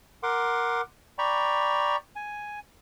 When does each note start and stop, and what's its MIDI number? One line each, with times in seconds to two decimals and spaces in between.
0.23 0.81 70
0.23 0.81 78
0.23 0.81 84
0.23 0.81 86
1.18 1.96 74
1.18 1.96 79
1.18 1.96 82
1.18 1.96 83
1.18 1.96 85
2.16 2.59 80